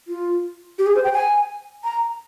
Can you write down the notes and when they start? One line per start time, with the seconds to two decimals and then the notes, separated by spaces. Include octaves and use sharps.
0.08 F4
0.79 G4
0.86 G#4
0.96 C5
1.04 G5
1.13 G#5
1.84 A#5